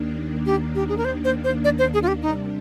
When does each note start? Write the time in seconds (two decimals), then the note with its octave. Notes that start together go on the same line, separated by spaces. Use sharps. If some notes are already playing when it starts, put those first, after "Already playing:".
Already playing: D#2 D#3 A#3 D4
0.46 G4
0.75 G4
0.89 G#4
0.98 A#4
1.05 C5
1.25 C5
1.44 C5
1.64 D5
1.79 C5
1.94 G#4
2.03 F4
2.08 G4
2.22 C3 G3 D4 D#4